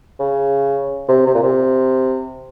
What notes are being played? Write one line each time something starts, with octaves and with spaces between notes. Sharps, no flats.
C#3
C3
C3
A#2
C3